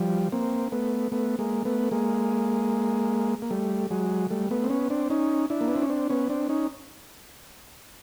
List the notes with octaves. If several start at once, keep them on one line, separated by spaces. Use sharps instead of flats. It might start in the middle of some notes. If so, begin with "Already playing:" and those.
Already playing: F3 G3
A#3 C4
A3 B3
A3 B3
G#3 A#3
A3 B3
G#3 A#3
A#3
G3 A3
F#3 G#3
G3 A3
A3 B3
C4
B3 C#4
C4 D4
C#4 D#4
D4 E4
A#3
B3
C4
C#4
C4 D4
B3 C#4
C4 D4
C#4 D#4